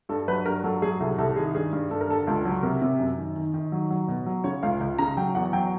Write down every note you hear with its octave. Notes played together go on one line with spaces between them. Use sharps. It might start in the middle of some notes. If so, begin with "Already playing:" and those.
G2 A4
F#3 B4
G2 A#4
F#3 A4
F#3 G#4
C2 A4
C2 A4
D#3 G#4
G2 G#4
G2
G2 A4
A#4
D3 A4
C#2 A4
F#3
C3 A#4
C3
F#2
D#3
D#3
D#3
F#3
F#3
B2
F#3
C#3 C#5
C#2 F5
C#2
C#3 A#5
F#3 G5
E2 F#5
F#3 G5